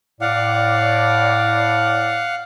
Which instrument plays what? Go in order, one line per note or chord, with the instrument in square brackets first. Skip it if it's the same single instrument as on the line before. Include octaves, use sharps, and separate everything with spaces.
[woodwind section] A2 D5 [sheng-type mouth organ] F5 F#5